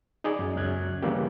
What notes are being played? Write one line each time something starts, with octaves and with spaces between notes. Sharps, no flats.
D#4 G#4 D5
F#2
C#2 F#2 F#6 G#6
C#3 E3 G3 A#3 G4